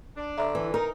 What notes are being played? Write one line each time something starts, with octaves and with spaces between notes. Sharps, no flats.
D4
D3 E5 A#5
E3
D#4 A#4